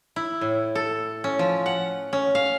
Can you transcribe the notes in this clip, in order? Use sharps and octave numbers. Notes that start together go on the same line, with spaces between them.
E4
A2
A4
C#4
F3
F#5
C#4
F5